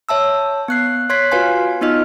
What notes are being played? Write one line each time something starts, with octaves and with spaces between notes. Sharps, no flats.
C#5 E5 A5 E6
B3 F#6 C7
C#5 C6 F#6 G#6 B6 C7
F4 F#4 B4 F5 G#5 C6
B3 D#4 F4 D#5 F6